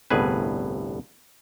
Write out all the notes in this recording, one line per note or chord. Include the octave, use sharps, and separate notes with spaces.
G1 C2 A2 G#4 B4